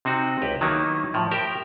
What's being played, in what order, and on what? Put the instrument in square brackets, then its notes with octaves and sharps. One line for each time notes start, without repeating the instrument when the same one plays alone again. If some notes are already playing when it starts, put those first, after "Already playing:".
[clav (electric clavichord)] C3 C4 D#4 F#4
C#2 G4 B4
D#3 F#3 A#3 B3 D#4 E4
A2 F3
G4 A#4 E5